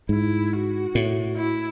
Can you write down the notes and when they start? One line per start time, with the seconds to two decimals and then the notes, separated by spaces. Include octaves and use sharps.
0.09 G#2 E4
0.53 F#4
0.95 A2
1.37 E4